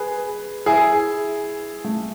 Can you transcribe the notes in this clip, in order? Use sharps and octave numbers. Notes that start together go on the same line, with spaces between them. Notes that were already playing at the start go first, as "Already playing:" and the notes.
Already playing: G#4 B4
E4 G#4
A3